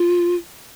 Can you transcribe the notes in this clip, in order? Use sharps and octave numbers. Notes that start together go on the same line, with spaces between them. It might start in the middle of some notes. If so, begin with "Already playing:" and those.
Already playing: F4